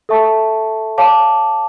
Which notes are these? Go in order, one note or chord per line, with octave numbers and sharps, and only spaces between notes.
A4 E5 A5 C#6
C#5 F5 A5 D6